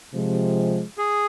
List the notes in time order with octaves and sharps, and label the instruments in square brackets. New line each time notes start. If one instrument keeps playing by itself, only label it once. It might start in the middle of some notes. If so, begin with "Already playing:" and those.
[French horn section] C3 F3 G#3
[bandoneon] G#4